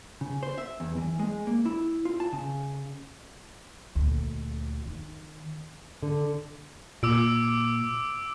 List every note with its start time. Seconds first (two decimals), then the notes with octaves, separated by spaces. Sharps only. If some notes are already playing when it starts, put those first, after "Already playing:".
0.21 C#3
0.43 C5
0.58 E5
0.80 E2
0.97 E3
1.19 G#3
1.47 A#3
1.65 E4
2.05 F4
2.20 A5
2.33 C#3
3.96 D2 A#2
4.86 D#3
6.03 D3
7.03 A#2 D6 E6 D7